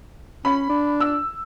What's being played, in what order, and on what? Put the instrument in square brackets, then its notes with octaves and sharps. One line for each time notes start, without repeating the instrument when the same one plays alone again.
[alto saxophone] C#4 [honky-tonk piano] B5
[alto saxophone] D4
[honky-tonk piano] E6